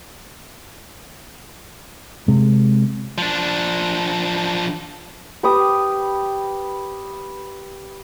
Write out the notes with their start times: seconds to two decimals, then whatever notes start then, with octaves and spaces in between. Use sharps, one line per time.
2.28 C3 G#3
3.18 F3 D4
5.43 G4 B4 D6 D#6